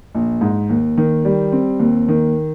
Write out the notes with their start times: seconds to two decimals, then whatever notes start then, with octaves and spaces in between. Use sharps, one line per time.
0.15 A#1
0.41 G#2
0.69 D#2
0.97 D#3
1.25 G3
1.52 C4
1.79 D#2
2.08 D#3